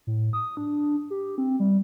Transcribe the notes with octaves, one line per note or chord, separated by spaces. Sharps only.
A2
D#6
D4
G4
C4
G3